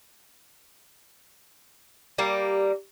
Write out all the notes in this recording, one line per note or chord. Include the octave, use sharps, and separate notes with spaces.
G3 A#3